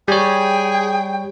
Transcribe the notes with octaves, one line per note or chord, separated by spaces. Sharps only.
G3 G#4 C#5 G5